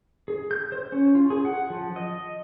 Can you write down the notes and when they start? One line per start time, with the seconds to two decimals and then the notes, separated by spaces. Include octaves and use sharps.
0.28 G#4
0.51 G6
0.72 C5
0.92 C#4
1.15 F4
1.30 G#4
1.45 F#5
1.70 F3
1.96 D#5